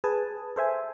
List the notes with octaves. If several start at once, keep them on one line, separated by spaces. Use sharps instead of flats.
G#4 B4 G#5 A5
A4 C5 E5 G#5